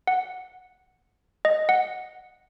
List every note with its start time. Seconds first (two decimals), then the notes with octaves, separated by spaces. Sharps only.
0.07 F#5
1.45 D#5
1.69 F#5